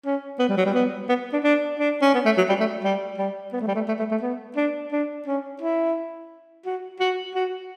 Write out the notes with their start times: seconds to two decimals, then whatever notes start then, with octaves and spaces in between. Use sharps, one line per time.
0.05 C#4
0.39 B3
0.49 G3
0.57 F#3
0.66 G3
0.74 B3
1.09 B3
1.33 D4
1.43 D4
1.79 D4
2.02 C#4
2.14 B3
2.25 A3
2.37 F#3
2.49 G3
2.60 A3
2.84 G3
3.18 G3
3.53 B3
3.61 A3
3.68 G3
3.75 A3
3.88 A3
3.99 A3
4.11 A3
4.22 B3
4.56 D4
4.92 D4
5.27 C#4
5.61 E4
6.66 F#4
7.00 F#4
7.35 F#4